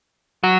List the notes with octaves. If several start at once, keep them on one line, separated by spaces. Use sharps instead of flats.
F#3